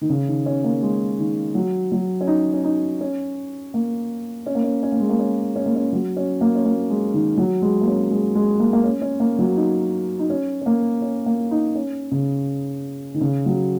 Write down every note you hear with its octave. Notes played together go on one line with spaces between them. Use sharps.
D#3
C#3
D#3
C#4
A#3
G#3
D#3
F#3
F#3
C#4
D#4
C#4
D#4
C#4
A#3
C#4
A#3
C#4
C#4
A#3
G#3
A#3
C#4
C#4
A#3
C#4
F#3
C#4
A#3
C#4
A#3
G#3
D#3
F#3
G#3
A#3
C#4
G#3
G#3
A#3
A#3
C#4
C#4
A#3
F#3
D#4
D#4
C#4
C#4
A#3
C#4
A#3
D#4
C#4
C#3
D#3
C#3
F#3